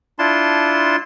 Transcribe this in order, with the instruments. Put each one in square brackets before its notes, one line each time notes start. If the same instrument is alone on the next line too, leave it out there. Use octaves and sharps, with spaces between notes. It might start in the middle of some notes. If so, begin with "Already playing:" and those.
[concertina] D4 E4 F4 A5 C6